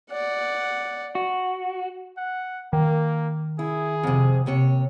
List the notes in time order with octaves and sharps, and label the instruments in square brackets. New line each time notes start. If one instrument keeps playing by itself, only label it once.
[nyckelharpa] D5 F#5
[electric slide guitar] F#4
[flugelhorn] F#5
[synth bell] D#3 [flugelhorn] A#3
[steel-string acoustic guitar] E4 [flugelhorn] G#4
[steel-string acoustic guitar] F2 C3
D#2 C3 C#5